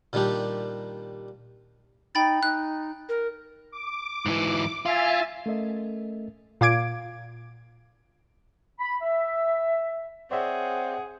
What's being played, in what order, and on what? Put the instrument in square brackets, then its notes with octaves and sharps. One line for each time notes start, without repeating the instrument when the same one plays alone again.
[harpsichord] A#2 D#3 G3 D4 G4
[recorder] D#4 [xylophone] G5 B5 A6
[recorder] D#4 [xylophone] F#6
[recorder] A#4
[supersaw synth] D6
[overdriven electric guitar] G#2 E3
[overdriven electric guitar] F4 [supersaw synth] E5 G#5 A6
[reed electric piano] A3 C#4 A4 A#4 D#5 E5
[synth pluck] A#2 F5 D6 G#6 D7
[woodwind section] B5
E5
[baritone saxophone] C4 [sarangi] G#4 [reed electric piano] C#5 D5 E5 [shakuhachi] F#5